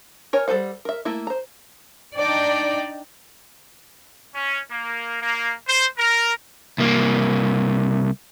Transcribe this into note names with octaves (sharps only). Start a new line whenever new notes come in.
A#4 C#5 G#5
G3 A4 B4 C5 F#5
A#4 E5
A3 A#3 E4
C5 A#5
D4 D#4 D5 G5
C#4
A#3
A#3
C5
A#4
C2 A#3